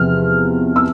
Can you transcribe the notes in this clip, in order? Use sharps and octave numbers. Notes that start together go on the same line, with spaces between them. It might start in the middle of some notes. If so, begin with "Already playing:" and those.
Already playing: E2 C3 F3 F6
E6